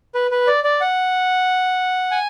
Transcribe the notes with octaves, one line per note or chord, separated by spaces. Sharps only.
B4
B4
D5
D5
F#5
G#5